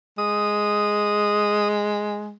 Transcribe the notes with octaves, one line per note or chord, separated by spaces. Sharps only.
G#3 D#6